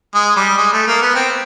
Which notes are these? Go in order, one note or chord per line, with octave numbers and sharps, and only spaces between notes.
G#3
G3
G#3
A3
A#3
B3
C4